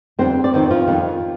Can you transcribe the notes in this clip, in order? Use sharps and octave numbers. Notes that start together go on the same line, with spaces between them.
F2 D3 G3 C4 C5
D5
F2 D#3 G3 C4 C5
F3 F4
F2 D#3 G3